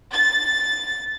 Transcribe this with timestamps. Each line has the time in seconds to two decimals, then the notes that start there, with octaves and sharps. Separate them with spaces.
0.13 A6